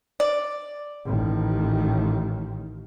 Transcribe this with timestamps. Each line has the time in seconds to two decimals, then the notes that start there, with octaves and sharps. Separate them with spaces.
0.20 D5
1.06 A1 D#3